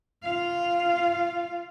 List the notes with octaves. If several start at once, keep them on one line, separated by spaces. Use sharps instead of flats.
F4 F5